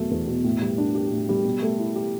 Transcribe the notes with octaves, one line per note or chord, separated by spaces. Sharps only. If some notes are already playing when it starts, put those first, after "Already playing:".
Already playing: E2 B2 F#3 A3
E2
B2
A2
G3
D4
G4
A2
G3
B2
A3
E4
G4